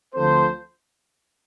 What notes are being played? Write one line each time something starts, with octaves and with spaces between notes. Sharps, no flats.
D2 D3 F3 C4 A4 C5